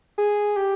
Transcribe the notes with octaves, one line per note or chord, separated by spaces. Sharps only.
G#4
G4